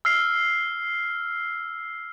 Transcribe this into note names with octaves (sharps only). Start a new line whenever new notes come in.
E6 F6 C7